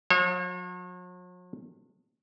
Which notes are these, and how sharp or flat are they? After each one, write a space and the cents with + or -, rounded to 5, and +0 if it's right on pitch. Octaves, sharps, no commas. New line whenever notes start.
F#3 -45 C#5 -40 F5 +0